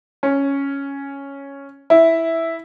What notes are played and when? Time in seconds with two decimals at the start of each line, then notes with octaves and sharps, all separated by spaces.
0.23 C#4
1.90 E4